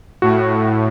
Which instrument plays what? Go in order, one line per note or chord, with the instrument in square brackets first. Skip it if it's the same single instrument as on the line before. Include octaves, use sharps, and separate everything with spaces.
[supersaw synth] A2 [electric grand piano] F#4